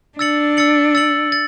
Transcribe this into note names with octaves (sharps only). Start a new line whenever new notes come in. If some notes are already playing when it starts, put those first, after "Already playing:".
D4 E6 A6 C#7 F#7
E6 A6 C#7 F#7
E6 A6 C#7 F#7
A6